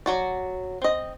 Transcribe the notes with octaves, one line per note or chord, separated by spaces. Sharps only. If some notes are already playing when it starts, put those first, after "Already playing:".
F#3 F#4 D5
C4 D#5